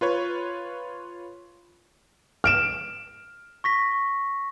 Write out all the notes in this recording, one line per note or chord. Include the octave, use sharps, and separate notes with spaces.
F4 B4 C#5
F6 D7 E7
C#6 A#6 B6